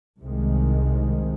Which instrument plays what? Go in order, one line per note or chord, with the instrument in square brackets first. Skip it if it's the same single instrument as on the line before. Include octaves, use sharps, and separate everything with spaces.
[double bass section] C2 C3 D#3 G#3